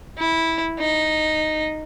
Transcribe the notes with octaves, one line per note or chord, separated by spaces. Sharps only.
E4
D#4